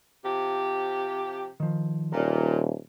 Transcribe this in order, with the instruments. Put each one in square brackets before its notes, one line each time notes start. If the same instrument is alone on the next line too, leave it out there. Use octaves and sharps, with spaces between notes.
[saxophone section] C3 F3 G4
[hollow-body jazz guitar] D#3 F3
[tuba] D#1 [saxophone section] A#2 [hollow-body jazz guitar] A#5